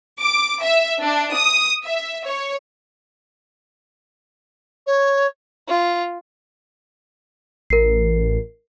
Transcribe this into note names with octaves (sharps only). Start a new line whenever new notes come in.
D6
E5
D4
D#6
E5
C#5
C#5
F4
A1 A#4 C7